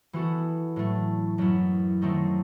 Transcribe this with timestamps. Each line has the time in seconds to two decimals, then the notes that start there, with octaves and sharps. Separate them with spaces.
0.13 E3 B3 F#4 A4
0.76 A2 F#3 A3
1.38 F#2 F#3 B3 E4
2.01 D#3 F#3 A3 C4 D#4